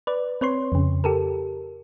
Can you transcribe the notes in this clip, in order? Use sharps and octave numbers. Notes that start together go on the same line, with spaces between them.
B4 D5
C4 B4 C#5 C6
F2 C#3
G4 A4 A#4